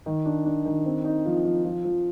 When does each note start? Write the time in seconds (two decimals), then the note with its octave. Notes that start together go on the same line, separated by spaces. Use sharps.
0.06 D#3
0.26 D4
0.46 D4
0.65 D#3
0.86 C4
1.05 D#4
1.25 F3
1.44 F3
1.65 F3
1.84 F3